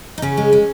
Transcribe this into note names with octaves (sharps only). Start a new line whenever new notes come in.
D#4
C#3 C#4
G#3
G#3